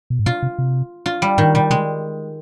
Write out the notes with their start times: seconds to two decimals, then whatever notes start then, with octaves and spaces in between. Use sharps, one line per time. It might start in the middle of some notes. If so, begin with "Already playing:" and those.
0.10 B2
0.19 G#2
0.26 B2 F4
0.42 C3
0.58 C3
1.06 F4
1.22 G3
1.38 G#2 D#3
1.54 B2 G3
1.70 C3 G#3